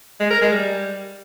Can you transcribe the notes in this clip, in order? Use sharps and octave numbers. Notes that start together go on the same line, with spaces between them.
G#3
A#4
G#3
G3